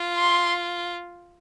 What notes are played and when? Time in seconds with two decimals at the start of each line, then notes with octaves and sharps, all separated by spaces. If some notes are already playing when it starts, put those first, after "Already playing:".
Already playing: F4
0.18 C6